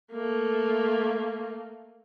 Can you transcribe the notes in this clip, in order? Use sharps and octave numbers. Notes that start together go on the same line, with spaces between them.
A3 A#3